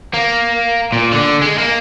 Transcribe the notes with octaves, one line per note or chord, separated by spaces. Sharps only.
A#3
A#2
D3
G#3
A#3